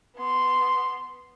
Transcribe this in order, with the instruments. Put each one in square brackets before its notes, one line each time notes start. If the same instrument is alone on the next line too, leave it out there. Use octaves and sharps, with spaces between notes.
[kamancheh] B3 C6